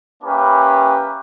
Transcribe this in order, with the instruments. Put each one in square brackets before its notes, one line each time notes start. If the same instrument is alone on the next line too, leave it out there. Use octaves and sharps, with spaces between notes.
[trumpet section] A#3 C#4 E4 G4 B4